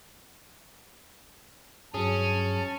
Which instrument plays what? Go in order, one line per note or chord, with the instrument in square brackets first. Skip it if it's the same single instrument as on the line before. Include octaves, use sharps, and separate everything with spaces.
[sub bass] G2 [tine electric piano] F#3 G#4 [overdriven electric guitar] C#4 [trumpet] A5